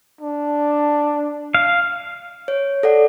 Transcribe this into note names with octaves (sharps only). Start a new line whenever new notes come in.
D4
F5
C#5
A4 D5 F#5